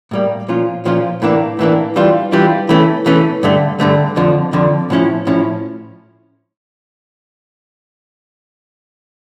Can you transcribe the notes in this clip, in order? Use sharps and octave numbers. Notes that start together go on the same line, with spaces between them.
A2 G3 A#3
A#2 F3 C#4 F4
A#2 F3 C#4 F4
A2 E3 A#3 D4
A2 E3 A#3 D4
E3 G3 D4 F4
E3 G3 D4 F4
E3 A3 C#4
E3 A3 C#4
G2 D3 A3
G2 D3 A3
F2 D3 F3
F2 D3 F3
A2 F3 C#4 E4
A2 F3 C#4 E4